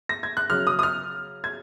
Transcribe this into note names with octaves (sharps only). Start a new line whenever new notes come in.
A#6
G#6
F#6
C#3 F#3 F6
D#6
D#6
F6
G#6